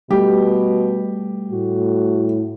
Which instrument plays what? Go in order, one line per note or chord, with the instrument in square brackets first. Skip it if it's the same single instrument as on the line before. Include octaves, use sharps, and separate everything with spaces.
[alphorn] B2 [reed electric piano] G3 A3 [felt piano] G4
[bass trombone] A2 [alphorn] F#4